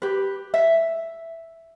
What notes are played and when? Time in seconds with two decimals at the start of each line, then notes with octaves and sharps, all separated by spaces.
0.02 G4 B4
0.54 E5